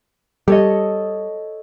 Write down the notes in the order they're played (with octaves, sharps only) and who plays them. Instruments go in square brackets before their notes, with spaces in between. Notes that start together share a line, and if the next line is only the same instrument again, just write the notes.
[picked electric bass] G3 [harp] A4 C#5 D#5